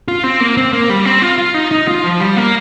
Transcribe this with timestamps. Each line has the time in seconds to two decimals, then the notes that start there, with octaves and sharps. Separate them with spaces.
0.08 F4
0.24 C4
0.40 A#3
0.57 C4
0.73 A#3
0.90 G3
1.05 C4
1.22 F4
1.38 F4
1.54 D#4
1.71 D#4
1.88 F4
2.04 F3
2.20 G3
2.37 A#3